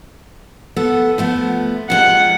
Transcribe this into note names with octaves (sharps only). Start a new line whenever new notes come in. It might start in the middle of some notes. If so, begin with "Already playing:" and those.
B3 A4 F#5
F3 A3 B3
C3 F3 G#3 F#5